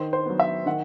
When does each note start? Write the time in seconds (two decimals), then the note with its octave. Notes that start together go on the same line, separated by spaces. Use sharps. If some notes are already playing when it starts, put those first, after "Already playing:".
Already playing: D#3 C5
0.13 C5
0.26 F#3 B3
0.40 E5
0.66 D#3 F#5